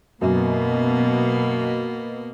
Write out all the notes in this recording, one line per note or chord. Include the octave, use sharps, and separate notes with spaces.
F#2 B2 A#3